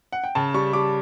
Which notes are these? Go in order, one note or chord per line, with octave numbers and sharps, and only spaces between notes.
F#5
G5
C#3 A5
G3 C#6
G3 D6